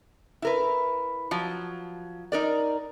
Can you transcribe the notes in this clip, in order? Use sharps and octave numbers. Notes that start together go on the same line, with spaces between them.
E4 A#4 B4
F3 F#3
D#4 A#4 D5